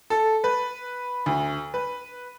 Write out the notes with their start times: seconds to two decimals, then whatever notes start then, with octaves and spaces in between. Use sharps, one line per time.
0.10 A4
0.44 B4
1.26 D2
1.74 B4